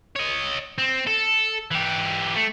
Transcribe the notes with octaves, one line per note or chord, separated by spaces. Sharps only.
C#5 D#5
C4
A4
E3 G4
A3